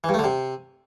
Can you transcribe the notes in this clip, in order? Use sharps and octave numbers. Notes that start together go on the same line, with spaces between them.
E3
G2
A3
D3
C3